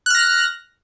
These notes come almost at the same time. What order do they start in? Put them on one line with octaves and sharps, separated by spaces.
F#6 F6 A#6